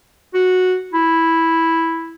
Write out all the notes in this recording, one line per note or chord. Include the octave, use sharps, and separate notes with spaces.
F#4
E4